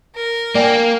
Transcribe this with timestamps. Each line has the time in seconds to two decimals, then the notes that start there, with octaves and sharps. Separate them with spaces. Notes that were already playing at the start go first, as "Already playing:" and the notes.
0.15 A#4
0.55 A#3 D5 G5 G#5